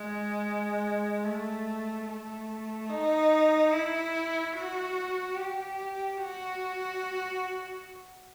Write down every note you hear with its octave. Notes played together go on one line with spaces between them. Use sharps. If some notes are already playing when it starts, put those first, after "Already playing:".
Already playing: G#3
A3
A3
D#4
E4
F#4
G4
F#4